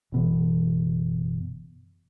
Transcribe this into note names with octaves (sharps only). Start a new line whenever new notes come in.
F#1 B2 E3